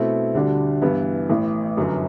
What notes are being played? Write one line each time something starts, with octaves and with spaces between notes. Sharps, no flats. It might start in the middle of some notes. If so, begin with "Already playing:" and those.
Already playing: B2 A3 C4 E4 A4
D2 D3 G3 D4 F#4
G2 E3 B3 E4
A1 A2 E3
G1 F#2 F#3